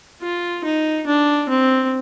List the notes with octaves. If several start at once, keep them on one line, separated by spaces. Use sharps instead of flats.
F4
D#4
D4
C4